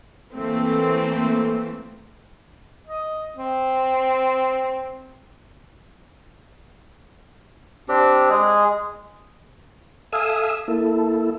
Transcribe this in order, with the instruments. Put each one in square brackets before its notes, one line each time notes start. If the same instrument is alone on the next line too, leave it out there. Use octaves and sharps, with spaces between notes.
[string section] E3 A3 A#3 C4
[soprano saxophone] D#5
C4
[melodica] C4 D4 G4
G#3 G#4
[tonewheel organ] A4 E5 F5 G#5 D#6 E6
A#3 E4 A4